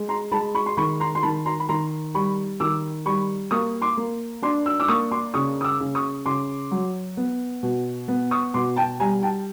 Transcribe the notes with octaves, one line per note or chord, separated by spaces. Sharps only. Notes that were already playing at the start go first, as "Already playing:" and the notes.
Already playing: G#3
A#5 C6
G#3 A5 B5
B5 C#6
C6
D#3 B5 C#6
A#5 C6
C6
D#3 A5 B5
A#5 C6
B5
D#3 A#5 C6
G3 B5 C#6
D#3 D6 E6
G3 B5 C#6
A#3 C#6 D#6
C6 D6
A#3
D4 C6 D6
E6
D6 E6
A#3 C#6 D#6
C6 D6
C#3 C#6 D#6
D#6
D6 E6
C#3
C#6 D#6
C#3 C6 D6
F#3
B3
B2
B3
C#6 D#6
B2 C6 D6
G5 A5
G3 G#5 A#5
G5 A5